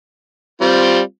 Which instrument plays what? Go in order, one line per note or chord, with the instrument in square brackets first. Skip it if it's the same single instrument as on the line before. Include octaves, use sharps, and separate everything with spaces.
[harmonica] G3 C4 F4